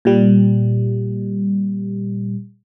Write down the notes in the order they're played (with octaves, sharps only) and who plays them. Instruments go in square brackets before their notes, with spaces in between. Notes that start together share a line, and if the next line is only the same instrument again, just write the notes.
[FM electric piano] A#2 G3